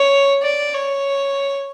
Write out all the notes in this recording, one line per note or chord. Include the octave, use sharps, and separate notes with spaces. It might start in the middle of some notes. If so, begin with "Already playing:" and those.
Already playing: C#5
D5
C#5